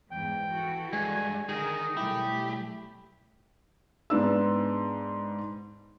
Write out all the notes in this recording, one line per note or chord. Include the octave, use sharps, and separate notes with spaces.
E2 G#2 G5
E3 F#4 A4
G2 G#3 G#5
D3 D#3 D#4 G#4 A#4
B1 G3 A3 E4 G4
G#2 B3 D4 E6